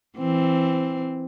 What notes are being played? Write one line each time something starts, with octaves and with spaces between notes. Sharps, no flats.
E3 C4